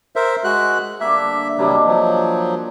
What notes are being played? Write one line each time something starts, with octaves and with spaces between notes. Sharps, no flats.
A#4 C5 E5
G#3 F#4 F#6
D3 G3 A#3 E5
C3 D#3 F#3 G3 A#3 D4
F3 F#3